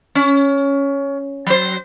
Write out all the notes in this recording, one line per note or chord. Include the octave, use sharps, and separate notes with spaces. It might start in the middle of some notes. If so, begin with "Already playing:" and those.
C#4
F#3 C5